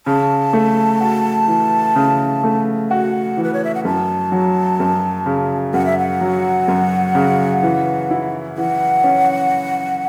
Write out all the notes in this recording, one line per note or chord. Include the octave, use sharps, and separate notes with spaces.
C#3 A5
A3
F#4
E3
C#3
A3
F#4 F#5
E3
B4
C#5
E5
F#5
F#2 A5
F#3
F#2
C#3
F#2 F#5
E5
F#5
F#3
F#2
C#3
E3
E4
E3 F#5
C#4